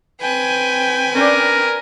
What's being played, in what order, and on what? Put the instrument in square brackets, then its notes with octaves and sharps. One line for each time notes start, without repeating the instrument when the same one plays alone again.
[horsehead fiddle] C4 G5 [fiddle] B4 G#5
[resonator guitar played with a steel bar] C#4 D4 D5 [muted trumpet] A#4